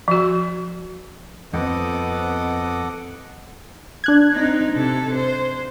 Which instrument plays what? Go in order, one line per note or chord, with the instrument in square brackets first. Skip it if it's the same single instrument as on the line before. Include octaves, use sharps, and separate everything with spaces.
[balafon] F3 F#4
[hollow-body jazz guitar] F2 [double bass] B3 C4 [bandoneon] A4 F#5 D6 [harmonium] D#5
[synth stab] D4 F#6 G#6
[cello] C4 D#4
C3 A4
C5